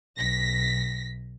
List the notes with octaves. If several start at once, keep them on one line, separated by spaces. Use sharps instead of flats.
B1 A#6 B6